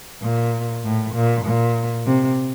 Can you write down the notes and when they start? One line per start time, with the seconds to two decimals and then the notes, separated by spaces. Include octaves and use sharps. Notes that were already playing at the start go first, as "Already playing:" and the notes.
0.23 A#2
0.84 A2
1.15 A#2
1.45 A#2
2.05 C3